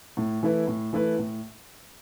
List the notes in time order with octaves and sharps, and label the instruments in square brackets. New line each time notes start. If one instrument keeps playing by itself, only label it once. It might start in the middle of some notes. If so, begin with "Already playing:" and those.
[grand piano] A2
E3 A3 E4 B4
A2
E3 A3 E4 B4
A2